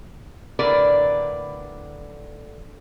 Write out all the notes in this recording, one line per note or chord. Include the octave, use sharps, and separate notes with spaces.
A2 D3 A#4 B4 D5